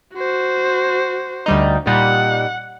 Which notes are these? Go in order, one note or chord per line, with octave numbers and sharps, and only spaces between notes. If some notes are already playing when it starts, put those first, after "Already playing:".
F#4 C5
D2 G3 D#4
A#2 G3 D#4 F#5